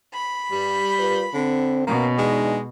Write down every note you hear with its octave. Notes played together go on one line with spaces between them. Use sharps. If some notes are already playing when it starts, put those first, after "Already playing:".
B5
G2 G3
F4 A#4 B4
D3 C4
B2 A#3 B3 C#4
E2 G#3 D4 D#4